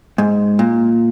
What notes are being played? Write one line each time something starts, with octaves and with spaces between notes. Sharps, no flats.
G#2
A#2